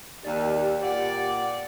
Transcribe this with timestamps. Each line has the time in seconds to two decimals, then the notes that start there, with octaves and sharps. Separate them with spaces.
0.24 D#2 G4 D5
0.83 A#2 D5 F#5